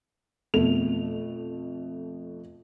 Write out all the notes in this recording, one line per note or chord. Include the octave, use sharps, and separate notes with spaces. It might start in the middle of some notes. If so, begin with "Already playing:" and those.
F2 B2 A3 F7